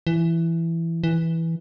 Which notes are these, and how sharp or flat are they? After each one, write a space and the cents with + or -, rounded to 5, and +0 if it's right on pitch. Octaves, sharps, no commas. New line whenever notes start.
E3 +10
E3 -5